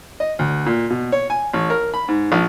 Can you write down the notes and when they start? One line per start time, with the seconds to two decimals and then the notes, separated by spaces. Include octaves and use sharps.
0.20 D#5
0.39 D2
0.66 A#2
0.90 B2
1.12 C#5
1.30 G#5
1.53 A1
1.70 A#4
1.94 B5
2.08 G#2
2.32 A#1